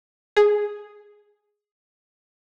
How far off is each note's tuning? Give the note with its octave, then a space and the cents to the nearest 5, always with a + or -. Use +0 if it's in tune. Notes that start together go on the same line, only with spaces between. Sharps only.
G#4 +0